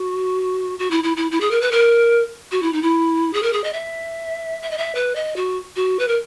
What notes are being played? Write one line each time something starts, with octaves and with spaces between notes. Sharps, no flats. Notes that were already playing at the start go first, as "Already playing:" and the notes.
Already playing: F#4
F#4
E4
E4
E4
E4
G#4
A#4
B4
A#4
F#4
E4
D#4
E4
G#4
A#4
G#4
D#5
E5
E5
D#5
E5
B4
D#5
F#4
F#4
B4
A#4